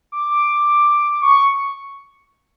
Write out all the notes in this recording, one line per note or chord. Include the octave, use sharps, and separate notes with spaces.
D6
D6
C#6